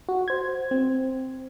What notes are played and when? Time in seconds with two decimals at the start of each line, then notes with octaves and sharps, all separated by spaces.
0.09 F#4
0.28 C5 G#6
0.71 C4